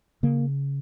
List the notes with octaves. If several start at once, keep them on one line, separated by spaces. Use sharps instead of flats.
C#3 A#3